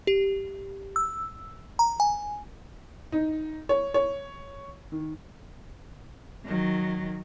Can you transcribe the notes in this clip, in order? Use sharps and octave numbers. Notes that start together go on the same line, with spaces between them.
G4
E6
A#5
G#5
D#4
C#5
C#5
D#3
D#3 F#3